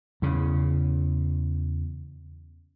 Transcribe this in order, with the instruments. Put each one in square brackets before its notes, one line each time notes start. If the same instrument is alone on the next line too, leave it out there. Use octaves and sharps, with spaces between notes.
[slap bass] E2 C#3